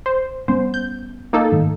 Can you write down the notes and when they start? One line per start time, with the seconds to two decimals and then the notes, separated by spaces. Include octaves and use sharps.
0.06 C5
0.48 G3 B3 C#4 C5
0.74 G6
1.33 A#3 D#4 A4
1.52 G#2 D#3 A3